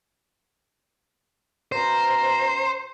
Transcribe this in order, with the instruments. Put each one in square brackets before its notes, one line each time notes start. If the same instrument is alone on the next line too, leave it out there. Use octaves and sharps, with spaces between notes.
[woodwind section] B2 C#4 A#5 [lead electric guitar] C5